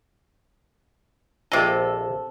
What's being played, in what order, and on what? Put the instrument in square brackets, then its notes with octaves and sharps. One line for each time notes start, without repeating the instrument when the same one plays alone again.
[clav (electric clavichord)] A#1 F4 D#5 [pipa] C3 A4